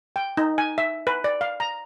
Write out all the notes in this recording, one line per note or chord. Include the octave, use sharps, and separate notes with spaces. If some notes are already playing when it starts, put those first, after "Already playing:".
G5
D#4
G#5
E5
B4
D5
F5
A#5